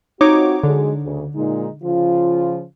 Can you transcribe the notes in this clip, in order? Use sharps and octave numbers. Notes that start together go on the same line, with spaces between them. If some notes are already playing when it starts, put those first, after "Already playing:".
C4 D#4 F4 F#4 C#5 D6
D3 F#3 G#3
D2 C#3
A#2 G#3 D#4
C#3 F3 F4